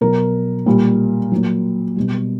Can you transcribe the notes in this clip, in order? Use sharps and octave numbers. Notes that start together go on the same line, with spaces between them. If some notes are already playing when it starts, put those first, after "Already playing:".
B2 F#3 A#4
A#2 G3
A#2 F#3
B2 G3